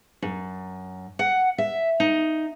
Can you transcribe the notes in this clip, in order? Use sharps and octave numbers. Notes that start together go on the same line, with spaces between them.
F#2
F#5
E5
D#4